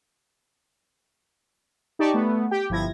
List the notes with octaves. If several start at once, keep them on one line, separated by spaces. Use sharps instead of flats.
D#4 G4 D5 A5 C#6
A3 B3
G4 G5
G1 F3 E4 G#6 A#6